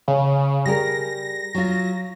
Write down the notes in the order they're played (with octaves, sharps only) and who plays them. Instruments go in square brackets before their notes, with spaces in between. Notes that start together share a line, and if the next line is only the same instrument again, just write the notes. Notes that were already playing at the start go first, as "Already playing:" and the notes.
[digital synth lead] C#3
[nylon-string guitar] G3 G#4 A#4 [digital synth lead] A#6
[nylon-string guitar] F#3 F4